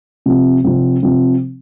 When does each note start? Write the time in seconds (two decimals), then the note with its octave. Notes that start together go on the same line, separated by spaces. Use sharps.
0.26 C3 F3 C4
0.64 C3 F3 C4
1.03 C3 F3 C4